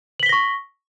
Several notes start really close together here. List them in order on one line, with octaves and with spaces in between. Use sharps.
F#7 B6 G7 A#6 C#6